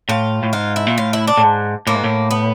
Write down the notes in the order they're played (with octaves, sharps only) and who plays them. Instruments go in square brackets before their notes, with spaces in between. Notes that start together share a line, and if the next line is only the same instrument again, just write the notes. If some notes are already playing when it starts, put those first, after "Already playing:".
[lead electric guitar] A2 [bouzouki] F4
[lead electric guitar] A2
[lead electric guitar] G#2 [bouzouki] F4
[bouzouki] E4
[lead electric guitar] A#2
[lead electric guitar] A2 [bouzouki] F4
[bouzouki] E4
D4
[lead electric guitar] A2
G#2
[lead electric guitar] A2 [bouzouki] A#3
[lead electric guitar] G#2
A2
[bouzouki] B3